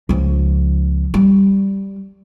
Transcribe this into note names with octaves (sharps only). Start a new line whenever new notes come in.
C#2 F3
G3